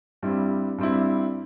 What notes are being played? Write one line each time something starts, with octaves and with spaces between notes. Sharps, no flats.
G2 G3 C4 E4
G2 G3 C4 E4